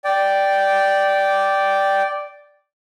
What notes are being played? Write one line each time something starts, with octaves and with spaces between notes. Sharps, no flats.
D5 G5